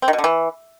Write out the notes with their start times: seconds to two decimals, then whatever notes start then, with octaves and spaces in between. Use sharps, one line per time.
0.02 C4
0.08 D#3
0.13 B2
0.19 D3
0.24 E3